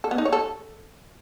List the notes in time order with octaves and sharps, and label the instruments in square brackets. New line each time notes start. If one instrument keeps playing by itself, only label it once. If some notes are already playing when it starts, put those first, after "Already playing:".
[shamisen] A4
B3
D#4
C#5
A4